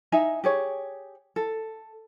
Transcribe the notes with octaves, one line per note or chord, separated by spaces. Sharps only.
D#4 E5 G#5 A#5
G4 G#4 C#5
A4